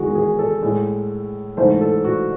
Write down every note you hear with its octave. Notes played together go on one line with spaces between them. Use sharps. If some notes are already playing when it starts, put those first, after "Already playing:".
Already playing: E2 D#3 G#3 F#4 G#4
G#4
A4
A2 G#3
G#2 E3 A3 C5
A4
F#4